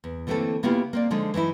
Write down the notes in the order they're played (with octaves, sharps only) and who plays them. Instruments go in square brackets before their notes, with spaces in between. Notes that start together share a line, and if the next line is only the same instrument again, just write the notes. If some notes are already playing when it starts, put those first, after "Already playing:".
[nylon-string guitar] E2
D3 E3 A3 A#3 C4 A4
C#3 A#3 B3 E4 F4 G4
A#3 C4 D5
D3 F3 G#3 D#4
E3 F#3 D#4 E4